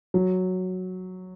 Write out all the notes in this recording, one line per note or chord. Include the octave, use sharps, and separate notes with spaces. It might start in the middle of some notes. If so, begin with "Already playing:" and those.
F#3